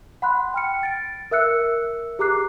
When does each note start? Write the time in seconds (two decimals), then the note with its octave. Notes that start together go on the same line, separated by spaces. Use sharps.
0.22 F#5 B5 C6 F#6
0.54 G5 F6 C#7
0.83 A6 D7
1.31 A#4 E5 E6 F#6 C#7
2.19 G4 G#4 A#5 D6 F#6 C7